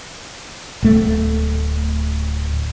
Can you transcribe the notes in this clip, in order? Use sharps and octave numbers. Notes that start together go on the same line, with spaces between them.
D1 A3